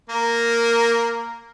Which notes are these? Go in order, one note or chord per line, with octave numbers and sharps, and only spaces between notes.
A#3 A#4